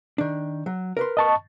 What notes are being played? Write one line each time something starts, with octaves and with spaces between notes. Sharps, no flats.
D#3 D4
F#3
A#4 B4 C6
D#5 A5 C#6